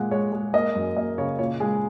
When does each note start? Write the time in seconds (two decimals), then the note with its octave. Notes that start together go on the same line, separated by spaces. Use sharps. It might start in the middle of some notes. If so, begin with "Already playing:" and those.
Already playing: A#2 G#3 F#5
0.11 G#3 C#5
0.32 G#3
0.53 A#3 D#5
0.75 F#2
0.96 A#3 D#5
1.18 C#3 C#5
1.39 A#2 C#5
1.60 G#3 G#4